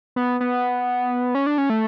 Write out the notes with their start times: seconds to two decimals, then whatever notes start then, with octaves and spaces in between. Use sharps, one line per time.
0.16 B3
0.41 B3
1.35 C#4
1.46 D4
1.58 C#4
1.70 A3